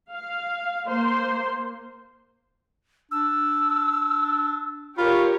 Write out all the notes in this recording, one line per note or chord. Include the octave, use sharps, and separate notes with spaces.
F5
A#3 C5 C6
D4 E6
F4 G4 A#4 C#5 B5